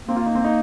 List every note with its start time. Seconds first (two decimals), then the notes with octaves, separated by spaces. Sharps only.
0.08 A#3 C4
0.16 F4
0.26 D#4
0.35 C4
0.44 D#4